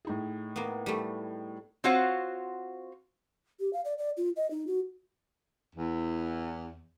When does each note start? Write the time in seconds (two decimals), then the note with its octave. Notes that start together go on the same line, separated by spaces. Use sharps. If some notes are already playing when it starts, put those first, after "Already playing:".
0.05 A2 D#4 G#4
0.56 A#3 B3
0.86 G3 A3
1.84 C4 F4 F#4 C5 C#5 F#5
3.60 G4
3.73 F5
3.85 D5
3.98 D5
4.17 F4
4.36 D#5
4.51 D#4
4.67 F#4
5.75 E2